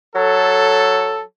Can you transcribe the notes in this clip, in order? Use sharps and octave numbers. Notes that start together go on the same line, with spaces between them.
F#3 A4